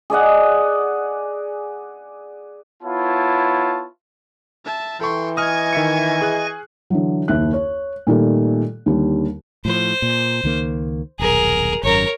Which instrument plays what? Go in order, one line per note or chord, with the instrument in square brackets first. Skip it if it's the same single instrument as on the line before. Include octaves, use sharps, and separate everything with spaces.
[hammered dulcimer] G#4 D5 D#5 F#5
[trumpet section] B3 E4 F4 C#5 A5
[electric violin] E5 A5
[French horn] E3 [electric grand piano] A4 C#6 [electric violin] G5 C6
[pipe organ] D#5 G#5 A#6 [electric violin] C#6 G#6 [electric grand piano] D#6 F6
[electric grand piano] D#3 E5 C#7
G#4 F#6
[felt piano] D3 E3 F#3
F#1 D#2 E5 F#6
C#5
A#2 D#3 G3 A3
D#2 D3 G3
[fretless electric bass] A2 F3 [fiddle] C5
[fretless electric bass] A#2
C#2 D#3 A#3
[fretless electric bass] D#1 B1 [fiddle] G#4 A#4
[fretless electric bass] G#1 F#2 [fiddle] A#4 C#5